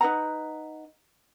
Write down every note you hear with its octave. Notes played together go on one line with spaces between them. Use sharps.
D#4 B4 F#5 A#5